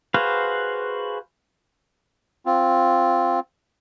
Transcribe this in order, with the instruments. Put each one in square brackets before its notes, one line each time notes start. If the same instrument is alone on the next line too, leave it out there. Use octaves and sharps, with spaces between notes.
[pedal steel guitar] F#4 G#4 B4 C5 F5
[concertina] C4 F4